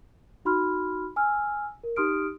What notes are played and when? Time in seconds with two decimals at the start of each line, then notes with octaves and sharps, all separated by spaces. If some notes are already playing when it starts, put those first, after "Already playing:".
0.45 D#4 F#4 B5 C6 F6
1.16 G#5 E6 F6
1.84 A#4
1.96 D#4 G4 C6 D#6 F6 D7